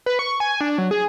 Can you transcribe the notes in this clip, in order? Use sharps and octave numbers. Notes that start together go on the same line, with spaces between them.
B4
C#6
G#5
D4
F#3
G#4